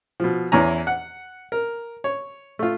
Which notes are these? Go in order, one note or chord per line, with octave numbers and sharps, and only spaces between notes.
B2 F3
E2 E3 C#4 E4 G#5 A#5
F#5
A#4
C#5
A3 F4